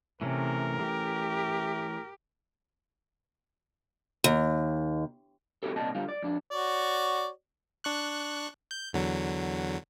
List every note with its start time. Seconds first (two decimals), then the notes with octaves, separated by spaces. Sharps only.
0.21 C3 E3 A3 C#4 A#4
0.82 G4
4.24 D#2
5.63 C4 E4 F#4 G4 A4
5.76 C2 A#2 C4 D5 D#5 A5
5.95 D3 G3 F4
6.09 D5
6.23 F2 D4
6.51 F#4 C#5 D5
7.84 D4 C#6 F#6
8.71 G6
8.93 E2 D3 F#3